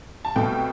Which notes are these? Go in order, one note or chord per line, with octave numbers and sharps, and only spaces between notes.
A5
C2 B2 A3 G5